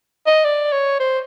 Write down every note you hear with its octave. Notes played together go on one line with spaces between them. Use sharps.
D#5
D5
C#5
C5